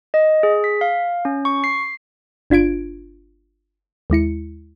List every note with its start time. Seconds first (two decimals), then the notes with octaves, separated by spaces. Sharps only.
0.14 D#5
0.43 G#4
0.64 B6
0.81 F5
1.25 C#4
1.45 C#6
1.64 C7
2.50 G1 D4 F4 G#6 D7
4.10 D#2 G#3 E4 C#7